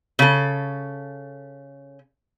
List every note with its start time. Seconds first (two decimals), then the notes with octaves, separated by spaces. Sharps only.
0.19 C#3 A4